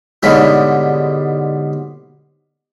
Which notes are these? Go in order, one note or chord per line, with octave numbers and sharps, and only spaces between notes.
G#2 B2 D3 G3 C#4 E4